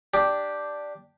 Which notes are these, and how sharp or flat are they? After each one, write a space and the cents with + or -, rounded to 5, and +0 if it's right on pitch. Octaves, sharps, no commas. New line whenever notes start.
D4 +0 G4 +0